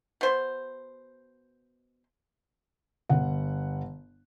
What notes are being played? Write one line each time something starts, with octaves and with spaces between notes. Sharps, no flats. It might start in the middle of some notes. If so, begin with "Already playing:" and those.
B2 C5
G1 F#5